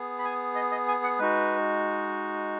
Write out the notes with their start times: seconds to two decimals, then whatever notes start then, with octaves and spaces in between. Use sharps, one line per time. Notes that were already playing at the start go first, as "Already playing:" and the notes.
Already playing: B3 G#4
0.19 B5
0.25 G#5
0.55 D#5
0.72 D#5
0.88 G#5
1.04 F#5
1.19 G#3 D#4 F#4 B4